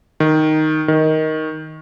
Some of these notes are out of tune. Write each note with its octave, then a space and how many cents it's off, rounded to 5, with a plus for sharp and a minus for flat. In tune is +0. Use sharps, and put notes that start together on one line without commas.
D#3 +0
D#3 +10